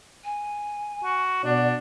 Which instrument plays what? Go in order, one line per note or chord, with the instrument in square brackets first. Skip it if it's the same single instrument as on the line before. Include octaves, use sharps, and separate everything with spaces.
[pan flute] G#5
[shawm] F#4
[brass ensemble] B2 F#4 D5 [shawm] D4